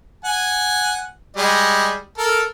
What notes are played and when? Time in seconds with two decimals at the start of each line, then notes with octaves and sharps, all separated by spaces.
0.25 F#5 G#5
1.37 G3 G#3 D#5
2.18 A4 A#4